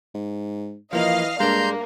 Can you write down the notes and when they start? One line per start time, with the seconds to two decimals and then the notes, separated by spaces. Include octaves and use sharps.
0.14 G#2
0.93 E3 F3 A#3 D#5 F5
1.40 G2 G#3 A#3 D4 A#5 C6 G6